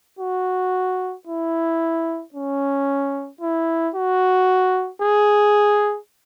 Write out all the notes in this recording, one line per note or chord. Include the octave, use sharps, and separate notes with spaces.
F#4
E4
C#4
E4
F#4
G#4